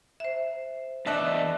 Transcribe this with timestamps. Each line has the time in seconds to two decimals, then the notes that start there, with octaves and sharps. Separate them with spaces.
0.20 C5 E5
1.06 E2 D4 D#5 E5 A5 F#6